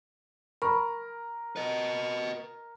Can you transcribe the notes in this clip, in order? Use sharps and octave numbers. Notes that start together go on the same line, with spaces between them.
A#4 B5 C#6
B4 D#5